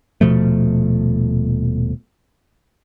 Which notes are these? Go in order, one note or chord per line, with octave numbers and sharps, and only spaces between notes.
D#1 B2 F3 A3